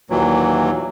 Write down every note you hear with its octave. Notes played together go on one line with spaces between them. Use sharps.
D#2 A#2 E3 F#3